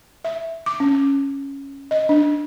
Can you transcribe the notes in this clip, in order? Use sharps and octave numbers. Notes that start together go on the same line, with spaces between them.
E5
D6
C#4
D#5
D4